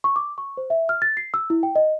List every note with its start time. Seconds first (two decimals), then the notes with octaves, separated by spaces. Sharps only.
0.04 C#6
0.16 D6
0.38 C#6
0.57 C5
0.70 E5
0.89 F6
1.02 A6
1.17 C7
1.34 E6
1.50 E4
1.63 G5
1.76 D#5